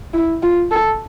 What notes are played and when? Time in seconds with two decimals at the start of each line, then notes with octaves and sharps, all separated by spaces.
0.13 E4
0.43 F4
0.71 A4